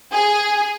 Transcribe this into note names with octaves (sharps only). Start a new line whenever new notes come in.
G#4